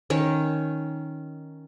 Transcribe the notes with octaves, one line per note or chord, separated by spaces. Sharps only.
D#3 C#4 C#5